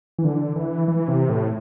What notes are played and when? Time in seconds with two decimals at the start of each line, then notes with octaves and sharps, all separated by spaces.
0.19 E3
0.25 D3
0.56 E3
0.88 E3
1.08 C3
1.29 A2